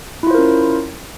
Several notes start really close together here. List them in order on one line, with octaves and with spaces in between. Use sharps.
E4 F4 C5 A#4 C#4